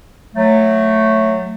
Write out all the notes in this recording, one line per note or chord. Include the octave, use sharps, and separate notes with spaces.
F#3 A3